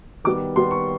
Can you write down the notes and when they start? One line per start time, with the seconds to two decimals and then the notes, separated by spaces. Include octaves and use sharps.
0.24 D#3 G3 B3 D6
0.56 D#3 G3 B3 C6
0.71 C#6